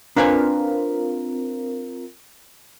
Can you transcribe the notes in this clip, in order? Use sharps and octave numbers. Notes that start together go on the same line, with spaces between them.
C4 D4 F4 A#4 B4 G#5